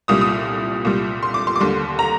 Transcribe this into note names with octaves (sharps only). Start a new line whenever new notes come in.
C2 A#2 G3 D#6
D#6
C2 A#2 G3
C6
D6
C6
D6
D#2 D3 G3 C6
A#5